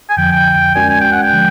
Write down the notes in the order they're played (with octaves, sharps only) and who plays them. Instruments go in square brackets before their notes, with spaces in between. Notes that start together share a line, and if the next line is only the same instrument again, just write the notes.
[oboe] G#5
[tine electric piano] F2 D3 F3 [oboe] G5
[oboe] G5
[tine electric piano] G#3 C#4 F#4 A#4 D5 [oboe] G#5
[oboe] G#5
G5
F#5
G5
[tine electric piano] D3 F3 G#3